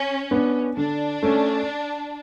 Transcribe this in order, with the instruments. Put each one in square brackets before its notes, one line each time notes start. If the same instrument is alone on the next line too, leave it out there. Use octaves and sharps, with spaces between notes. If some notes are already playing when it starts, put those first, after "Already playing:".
Already playing: [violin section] C#4
[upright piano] B3 D4
[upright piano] D3 [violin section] D4
[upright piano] A3 C#4